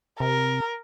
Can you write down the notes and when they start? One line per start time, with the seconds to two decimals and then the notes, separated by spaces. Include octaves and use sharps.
0.20 C3 A#4